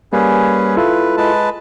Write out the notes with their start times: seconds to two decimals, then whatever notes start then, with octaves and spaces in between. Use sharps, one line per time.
0.13 G3 A#3 C#4 G#4 B4
0.77 E4 F4 A4 B4
1.17 G#3 B4 A5